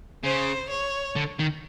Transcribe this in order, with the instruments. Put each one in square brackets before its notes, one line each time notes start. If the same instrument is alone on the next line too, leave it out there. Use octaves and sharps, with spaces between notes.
[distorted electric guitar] C#3 [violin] C5
[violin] C#5
[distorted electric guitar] D3
D#3